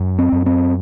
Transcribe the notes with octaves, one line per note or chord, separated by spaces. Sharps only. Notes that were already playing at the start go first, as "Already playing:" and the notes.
Already playing: F#2
C4
F#2
C4